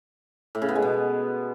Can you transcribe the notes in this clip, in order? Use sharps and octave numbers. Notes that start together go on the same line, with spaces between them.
A2
C#3
B3
G#3
B2